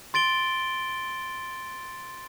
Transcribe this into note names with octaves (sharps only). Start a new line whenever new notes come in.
C6 A6 D7 G7